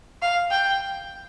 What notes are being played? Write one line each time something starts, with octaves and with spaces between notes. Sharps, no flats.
F5
G5